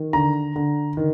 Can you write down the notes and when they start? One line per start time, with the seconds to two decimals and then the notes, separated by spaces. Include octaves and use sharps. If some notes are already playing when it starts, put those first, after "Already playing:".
Already playing: D#3
0.13 D3 A#5
0.56 D3
0.97 D#3